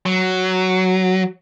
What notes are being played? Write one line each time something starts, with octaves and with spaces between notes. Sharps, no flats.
F#3